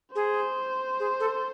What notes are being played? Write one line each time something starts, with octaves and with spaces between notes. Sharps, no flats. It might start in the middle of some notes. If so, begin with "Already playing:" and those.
G#4 C5
G#4
A4